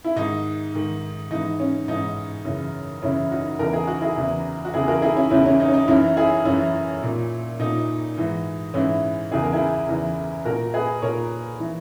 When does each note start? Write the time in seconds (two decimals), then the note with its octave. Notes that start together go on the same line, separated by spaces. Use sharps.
0.04 E4
0.16 G#2 D#3 D#4
0.74 G#2 D#3
1.31 G#2 E3 D#4
1.60 C#4
1.88 G#2 E3 D#4
2.45 F#2 C#3 E3
3.02 F#2 C#3 E3 C#4 E4
3.31 D#4 F#4
3.59 E2 C#3 E3 A#4
3.73 G#4
3.87 F#4
4.01 E4 G#4
4.17 E2 C#3 E3
4.65 F#4
4.74 E2 C#3 E3 E4 G#4
4.88 F#4 A#4
5.02 E4 G#4
5.16 C#4 E4
5.31 E2 C#3 E3 C#4 E4
5.46 C#4
5.60 D#4
5.68 C#4
5.73 D#4
5.88 F#2 E3 C#4 E4
6.17 E4 G#4
6.45 F#2 E3 C#4 E4
7.03 A#2
7.59 A#2 D#4
8.16 G#2 E3
8.74 G#2 E3 C#4 E4
9.31 E2 C#3 E3 G#4
9.42 A#4
9.53 E4 G#4
9.88 E2 C#3 E3
10.45 A#2 F#4 A#4
10.74 G#4 B4
11.02 A#2 A#4 C#5
11.60 E3